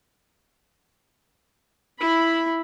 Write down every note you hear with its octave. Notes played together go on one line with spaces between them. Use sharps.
E4 B5